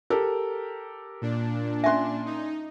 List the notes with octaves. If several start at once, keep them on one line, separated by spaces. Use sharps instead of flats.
G4 A4 A#4
A#2 D4
C#4 E5 G#5 C6
D#4